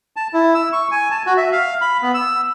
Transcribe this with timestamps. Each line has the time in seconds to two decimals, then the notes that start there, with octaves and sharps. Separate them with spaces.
0.16 A5
0.33 E4
0.55 E6
0.73 C#6
0.92 G#5
1.11 A5
1.26 F#4
1.37 E5
1.52 F5
1.81 B5
2.02 B3
2.14 E6